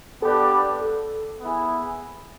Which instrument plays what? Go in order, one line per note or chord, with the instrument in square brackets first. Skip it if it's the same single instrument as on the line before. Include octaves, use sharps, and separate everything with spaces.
[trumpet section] B3 D4 G4 B4 D5 [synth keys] A4
[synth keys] A4
[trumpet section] B3 E4 G#4